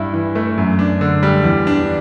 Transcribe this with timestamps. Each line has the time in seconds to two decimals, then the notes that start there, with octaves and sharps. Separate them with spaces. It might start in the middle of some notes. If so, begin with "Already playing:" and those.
Already playing: G2 E4
0.14 E3
0.35 A3
0.58 F#2
0.79 D4
1.01 D3
1.23 G3
1.44 E2
1.67 D4